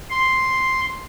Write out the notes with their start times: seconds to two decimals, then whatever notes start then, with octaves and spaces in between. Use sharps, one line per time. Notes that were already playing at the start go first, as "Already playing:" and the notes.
0.10 C6